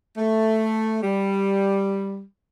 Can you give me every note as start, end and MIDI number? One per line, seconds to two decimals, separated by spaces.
0.17 1.00 57
1.03 2.22 55